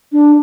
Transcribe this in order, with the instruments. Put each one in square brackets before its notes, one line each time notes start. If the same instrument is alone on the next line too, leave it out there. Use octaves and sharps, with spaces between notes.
[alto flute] D4